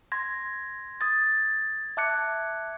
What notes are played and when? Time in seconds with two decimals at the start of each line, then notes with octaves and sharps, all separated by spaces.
0.12 C6 G#6 A#6
1.01 D#6 G#6 A6
1.97 E5 A5 D6 F#6 G#6 C#7